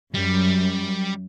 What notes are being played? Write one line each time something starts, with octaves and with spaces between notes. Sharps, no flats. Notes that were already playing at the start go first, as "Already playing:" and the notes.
F#2 G3